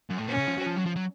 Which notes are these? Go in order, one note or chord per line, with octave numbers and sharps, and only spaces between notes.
F#2
A2
A#2 C#4
C#3
F3
F#3
F3
F#3
F3
F#3